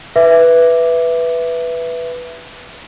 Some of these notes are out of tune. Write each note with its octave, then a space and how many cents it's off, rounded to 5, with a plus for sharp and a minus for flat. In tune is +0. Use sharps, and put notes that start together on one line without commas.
B4 +0 E5 +5 D6 +0